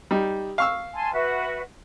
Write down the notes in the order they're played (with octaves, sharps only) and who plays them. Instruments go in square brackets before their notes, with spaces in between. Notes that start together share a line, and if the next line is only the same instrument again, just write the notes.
[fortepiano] G3 D#4
F5 C#6 E6
[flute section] G#5 A5 C6
F#4 B4 E5